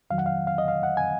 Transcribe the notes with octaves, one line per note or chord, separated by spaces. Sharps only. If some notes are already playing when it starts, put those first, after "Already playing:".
F2 D#3 F#3 F5
F#5
F5
F5
D#5
F5
F#5
G#5